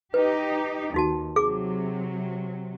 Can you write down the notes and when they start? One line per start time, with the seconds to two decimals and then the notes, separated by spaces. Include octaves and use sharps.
0.14 D#4 G4 B4
0.94 D#2 D#4 F#4 A5
1.36 C3 F#3 G#4 D6